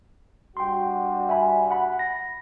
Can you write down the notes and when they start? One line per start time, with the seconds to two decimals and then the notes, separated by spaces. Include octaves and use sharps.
0.57 G3 D4 F#4 G5 C6
1.29 E5 G#5 B5
1.71 F#5 B5
1.99 A#6